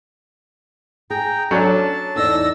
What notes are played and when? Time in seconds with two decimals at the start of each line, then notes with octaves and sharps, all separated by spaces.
1.10 G#4 G5 A#5
1.51 F#3 C#4 D4 A4 A5
2.16 E2 D#4 D5 E6 A#6